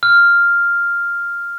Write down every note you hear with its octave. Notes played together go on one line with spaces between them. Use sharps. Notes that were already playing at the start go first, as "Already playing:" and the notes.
F6